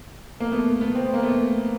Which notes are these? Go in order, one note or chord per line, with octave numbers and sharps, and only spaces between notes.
A#3
A3 B3
A3 B3
C4
B3
A#3
A3 B3